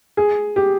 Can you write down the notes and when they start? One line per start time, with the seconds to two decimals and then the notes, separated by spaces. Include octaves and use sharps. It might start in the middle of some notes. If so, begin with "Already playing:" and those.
0.17 G#4
0.56 G4